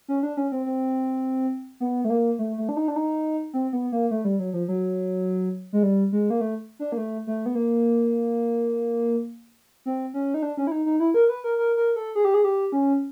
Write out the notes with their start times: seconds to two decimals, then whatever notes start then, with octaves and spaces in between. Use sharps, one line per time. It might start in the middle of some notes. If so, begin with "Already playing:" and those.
0.08 C#4
0.23 D4
0.37 C#4
0.52 C4
0.66 C4
1.80 B3
2.05 A3
2.10 A#3
2.39 A3
2.58 A3
2.69 D4
2.77 D#4
2.88 D4
2.96 D#4
3.54 C4
3.73 B3
3.92 A#3
4.11 A3
4.25 G3
4.39 F#3
4.53 F3
4.68 F#3
5.73 G#3
5.83 G3
6.12 G#3
6.30 A#3
6.41 A3
6.79 D4
6.92 A#3
6.98 A3
7.27 A3
7.46 B3
7.55 A#3
9.86 C4
10.14 C#4
10.34 D#4
10.43 D4
10.57 C#4
10.67 E4
10.72 D#4
10.86 D#4
11.00 E4
11.14 A#4
11.29 B4
11.44 A#4
11.58 A#4
11.77 A#4
11.96 A4
12.15 G#4
12.25 G4
12.34 G#4
12.44 G4
12.72 C#4